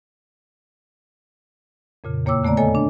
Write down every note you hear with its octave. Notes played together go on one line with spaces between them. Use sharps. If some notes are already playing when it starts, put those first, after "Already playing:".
F2 A#2 C#3
E2 A#3 C#5 G5 D6 E6
D3 A3 B3 D5 A#5
A4 C#5 D#5 G#5
D4